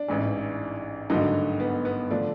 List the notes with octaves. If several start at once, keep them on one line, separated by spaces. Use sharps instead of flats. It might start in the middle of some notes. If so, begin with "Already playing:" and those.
Already playing: D4
A1 G#2 E3
G#1 G2 D3 F#3 A3 D#4
B3
B3
D3 F3 A3 D4